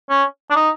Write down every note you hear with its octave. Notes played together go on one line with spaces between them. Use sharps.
C#4
D4
D#4